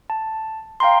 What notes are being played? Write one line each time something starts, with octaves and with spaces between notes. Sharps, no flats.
A5
F5 G5 A#5 C6